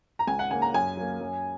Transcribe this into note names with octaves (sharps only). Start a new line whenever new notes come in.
A#5
C#2 G#5
F#5
C#3 A#3 G#5
A#5
F#2 G#5
F#3 A#3
F#2